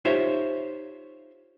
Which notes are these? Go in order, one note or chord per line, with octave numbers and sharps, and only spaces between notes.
D#4 F4 G4 C5 C#5 E5